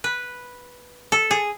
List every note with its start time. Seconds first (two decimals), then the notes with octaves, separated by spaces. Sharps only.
0.04 B4
1.12 A4
1.31 G#4